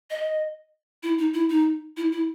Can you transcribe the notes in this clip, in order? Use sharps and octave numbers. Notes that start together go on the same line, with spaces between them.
D#5
E4
D#4
E4
D#4
E4
E4